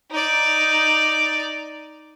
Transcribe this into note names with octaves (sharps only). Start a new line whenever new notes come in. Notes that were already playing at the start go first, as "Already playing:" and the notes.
D#4 D5